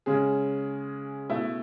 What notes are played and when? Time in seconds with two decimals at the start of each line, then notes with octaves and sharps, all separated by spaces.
0.06 C#3 G#3 C#4 G#4
1.30 B2 A3 E4